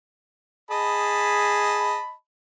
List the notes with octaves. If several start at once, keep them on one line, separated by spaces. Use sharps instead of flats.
G#4 D#5 A5 B5